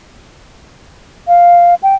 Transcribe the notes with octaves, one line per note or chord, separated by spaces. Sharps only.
F5
G5